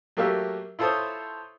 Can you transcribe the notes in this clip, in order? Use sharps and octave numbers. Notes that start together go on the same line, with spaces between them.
F#3 A3 A#3 G4 E5 F5
E4 F4 A4 C5 C#5 D#6